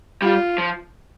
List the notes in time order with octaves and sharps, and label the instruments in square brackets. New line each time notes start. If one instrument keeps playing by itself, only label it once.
[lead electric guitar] G3 [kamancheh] F4
[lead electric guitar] F3